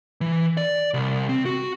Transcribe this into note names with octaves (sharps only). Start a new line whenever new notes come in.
E3
D5
C2
C4
F#4